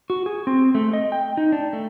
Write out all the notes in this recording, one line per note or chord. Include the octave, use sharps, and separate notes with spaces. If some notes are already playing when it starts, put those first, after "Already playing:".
F#4
G#4
C4
A3
D#5
G5
D#4
D4
A3